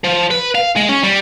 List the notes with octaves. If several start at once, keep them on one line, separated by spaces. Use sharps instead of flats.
F3
B4
F5
G#3
C#4
G3